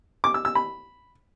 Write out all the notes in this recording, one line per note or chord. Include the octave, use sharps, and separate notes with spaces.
D6
E6
E6
B5